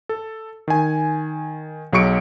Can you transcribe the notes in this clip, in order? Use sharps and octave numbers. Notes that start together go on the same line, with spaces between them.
A4
D#3 G#5
B1 F#3 G#4 C#6 C#7 D7